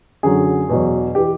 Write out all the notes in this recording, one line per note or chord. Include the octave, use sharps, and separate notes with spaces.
F#2 D3 F#3 G#4
E2 B2 F#3
E3 G4